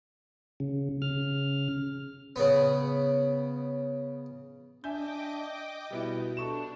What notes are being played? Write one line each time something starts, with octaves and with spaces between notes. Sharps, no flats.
C#3
C#3 F6
C#3 B3
D4 D#5 E5 G5 G#5 D6 G6
B2 G3 B3 E4
D4 A4 C#6 E7